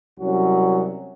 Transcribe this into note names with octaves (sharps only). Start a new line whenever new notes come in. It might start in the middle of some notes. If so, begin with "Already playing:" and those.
C2 F#3 C#4 F#4